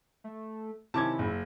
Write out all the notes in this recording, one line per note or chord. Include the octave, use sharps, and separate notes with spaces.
A3
C3 D#3 C#4 E4 A5 D6 G#6
F#1